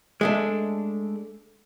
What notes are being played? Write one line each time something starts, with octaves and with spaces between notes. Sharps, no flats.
G#3 A3 D4